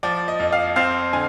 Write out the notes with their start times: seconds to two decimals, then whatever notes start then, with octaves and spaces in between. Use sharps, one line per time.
0.03 F3 D5
0.28 D#5
0.40 F2
0.52 F5
0.76 C4 F5
1.13 D3 G#5